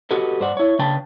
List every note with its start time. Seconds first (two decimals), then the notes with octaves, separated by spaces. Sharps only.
0.11 F#4 G4 A4 B4 D#5
0.40 G2 C5 D5 F#5
0.57 E4 C#5
0.79 C#3 D4 B4 G5 A5